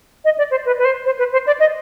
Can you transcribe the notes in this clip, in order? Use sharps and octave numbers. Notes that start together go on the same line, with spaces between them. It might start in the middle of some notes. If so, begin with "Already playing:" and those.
D#5
D5
C5
B4
B4
C5
C5
B4
C5
D5
D#5